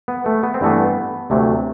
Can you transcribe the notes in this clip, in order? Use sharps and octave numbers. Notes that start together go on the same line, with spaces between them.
B3
A3
B3
C4
G2 E3 A3 B3
D2 C3 F#3 A3